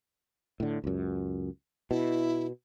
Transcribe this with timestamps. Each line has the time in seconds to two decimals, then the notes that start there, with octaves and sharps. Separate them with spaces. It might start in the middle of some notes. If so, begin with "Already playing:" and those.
0.60 A2 D3
0.84 C#2 F#2
1.91 B2 E4